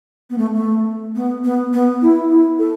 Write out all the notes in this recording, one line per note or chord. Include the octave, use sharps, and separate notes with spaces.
B3
A3
A3
B3
B3
B3
E4
E4
A4